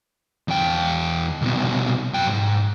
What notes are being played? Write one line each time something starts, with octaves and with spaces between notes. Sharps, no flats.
E2 G5
C2 B2
F#2 G5
G#2